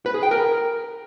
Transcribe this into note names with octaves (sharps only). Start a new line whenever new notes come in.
B4
G#4
G5
A#4